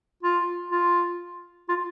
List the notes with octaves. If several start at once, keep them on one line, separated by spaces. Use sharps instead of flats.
F4
F4
F4